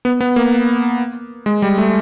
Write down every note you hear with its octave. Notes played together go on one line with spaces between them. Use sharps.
B3
B3
A#3
G#3
G3
A3